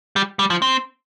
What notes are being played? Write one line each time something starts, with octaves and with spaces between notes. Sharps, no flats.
G3
G3
F3
C4